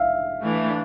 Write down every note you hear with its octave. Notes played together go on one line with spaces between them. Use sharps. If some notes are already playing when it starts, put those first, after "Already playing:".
Already playing: E5 F5
E3 A3 D4